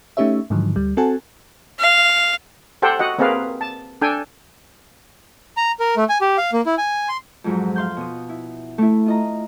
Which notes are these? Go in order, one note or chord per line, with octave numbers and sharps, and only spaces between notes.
A3 C#4 D#4 G4 C#5 E5
G#2 D3 D#3 F3 F#3
D2 G3
C4 F#4 A4 F#5 G#5 A5
F5
G4 A4 C5 F#5 G5
F#4 D#5 F#5
A#3 C4 G#4 A#4 B4 F5
A5
D4 A4 G5 G#5
A#5
A#4
A3
G#5
G4
F5
A#3
E4
G#5
C6
F2 G#2 F#3
F5 C6 G6
B2 D#6
E4
A3 E4
F4 D#5 A#5